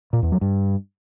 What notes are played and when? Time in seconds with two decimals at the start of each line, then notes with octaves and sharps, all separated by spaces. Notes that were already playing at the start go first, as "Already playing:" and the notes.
0.13 A#2
0.22 E2
0.32 F#3
0.41 G2